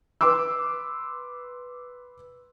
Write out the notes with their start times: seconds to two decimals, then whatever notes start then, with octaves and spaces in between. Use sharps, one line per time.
0.21 B4 C6 D6 E6